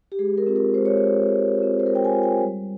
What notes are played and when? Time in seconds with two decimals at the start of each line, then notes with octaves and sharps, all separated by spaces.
0.12 G4
0.19 G#3 G#4
0.38 A#4
0.47 C4 F4
0.56 A#4
0.74 G#3 C5
0.85 C#5
0.97 C5
1.03 C4 F4
1.30 G#3
1.58 C4 F4
1.79 C5
1.86 G#3 A#4
1.95 G5
2.05 G#5
2.14 C4 F4
2.23 G5
2.42 G3